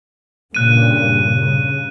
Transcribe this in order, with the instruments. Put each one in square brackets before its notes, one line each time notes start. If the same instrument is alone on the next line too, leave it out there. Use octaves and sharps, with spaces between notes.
[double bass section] G2 A#2 C#3 [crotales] F#6 D#7
[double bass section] C#3